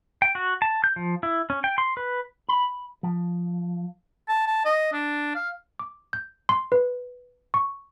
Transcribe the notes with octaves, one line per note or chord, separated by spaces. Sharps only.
G5
F#4
A5
G6
F3
E4
C#4
G5
C6
B4
B5
F3
A5
A5
D#5
D4
F5
D6
G6
C6
B4
C#6